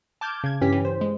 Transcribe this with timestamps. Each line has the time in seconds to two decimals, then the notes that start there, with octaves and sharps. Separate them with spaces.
0.21 A5 D6 F6 G6 G#6
0.44 C#3 G#6
0.61 G2 E3 C#4 G4 B6
0.72 E3
0.85 C5
1.01 G#3